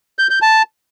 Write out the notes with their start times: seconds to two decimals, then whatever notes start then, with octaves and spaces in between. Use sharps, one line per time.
0.19 G6
0.30 G6
0.42 A5